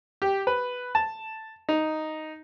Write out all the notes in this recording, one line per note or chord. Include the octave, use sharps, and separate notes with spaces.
G4
B4
A5
D#4